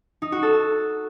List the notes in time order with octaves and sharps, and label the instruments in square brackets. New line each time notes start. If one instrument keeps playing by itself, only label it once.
[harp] D#4
F#4
A4
A5